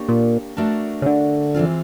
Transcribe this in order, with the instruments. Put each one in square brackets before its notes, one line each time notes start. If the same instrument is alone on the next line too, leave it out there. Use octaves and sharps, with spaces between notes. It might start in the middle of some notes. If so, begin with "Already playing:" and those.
Already playing: [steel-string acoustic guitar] A#3 D4 G4 A#4 C#5
[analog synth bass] A#2
[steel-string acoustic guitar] A3 D4 F#4 A#4 D5
[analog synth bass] C#3
D3
[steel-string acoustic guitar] E3 G#3 C4 F4